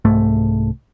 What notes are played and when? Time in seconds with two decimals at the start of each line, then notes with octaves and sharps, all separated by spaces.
0.05 C2 G#2 A3